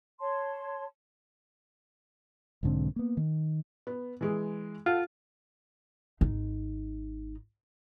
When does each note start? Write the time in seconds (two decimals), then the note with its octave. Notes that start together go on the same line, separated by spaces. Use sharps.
0.20 C#5 A5 C6
2.63 B1 G#2 D3 C4
2.96 A#3 B3
3.17 D#3
3.87 B3
4.21 E3 G#3 G#4
4.86 F4 A4 F#5
6.21 G#1 D#4